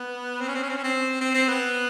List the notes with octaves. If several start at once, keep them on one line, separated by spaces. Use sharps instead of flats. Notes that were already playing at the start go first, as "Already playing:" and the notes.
Already playing: B3
C4
C#4
C4
C#4
C4
C#4
C4
C4
C4
B3